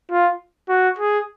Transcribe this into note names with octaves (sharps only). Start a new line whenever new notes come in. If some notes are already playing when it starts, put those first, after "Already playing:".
F4
F#4
G#4